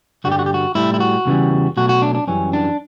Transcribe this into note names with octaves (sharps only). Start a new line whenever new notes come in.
G2 D3 G3 F#4
G4
F#4
G4
F#4
A2 G3 E4
E4
F#4
E2 C#3 E3 G3
B2 F#3 A3 F#4
F#4
D4
D4
F#2 E3 G3 C#4
D4